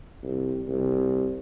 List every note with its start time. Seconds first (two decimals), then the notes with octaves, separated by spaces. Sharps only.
0.23 C2
0.68 C2